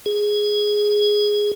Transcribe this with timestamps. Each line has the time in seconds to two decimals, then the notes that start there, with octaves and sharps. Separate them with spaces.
0.06 G#4